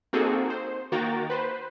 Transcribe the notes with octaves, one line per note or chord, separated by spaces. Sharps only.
A#3 C4 D#4 F#4 G#4 A4
C5
D#3 A#3 F#4 G5 A#5 A6
B4 C5